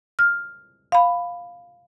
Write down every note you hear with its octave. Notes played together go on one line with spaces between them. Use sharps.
F6
F5 B5